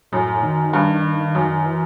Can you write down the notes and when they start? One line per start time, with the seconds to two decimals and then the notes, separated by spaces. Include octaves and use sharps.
0.12 F#2 A2
0.43 D#3
0.73 G2
1.35 F#2
1.66 E3